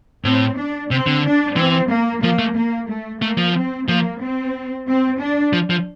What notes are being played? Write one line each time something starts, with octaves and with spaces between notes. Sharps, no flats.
A2 C4
D4
C3 C4
D3
D4
E3 C4
A#3
F3 A#3
A3
A#3
A3
A3 A#3
F3
C4
F3 A#3
C4
C4
D4
F3
F3